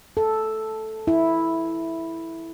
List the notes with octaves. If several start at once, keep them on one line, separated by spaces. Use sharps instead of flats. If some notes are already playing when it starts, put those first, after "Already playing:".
A4
E4